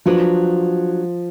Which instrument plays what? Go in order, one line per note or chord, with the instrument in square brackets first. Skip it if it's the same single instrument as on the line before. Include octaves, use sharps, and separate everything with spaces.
[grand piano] F3 [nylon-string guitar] F#3 D4 F#4 B4